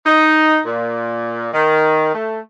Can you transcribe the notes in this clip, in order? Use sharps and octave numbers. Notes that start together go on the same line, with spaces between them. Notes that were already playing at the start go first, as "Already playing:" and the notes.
D#4
A#2
D#3
A3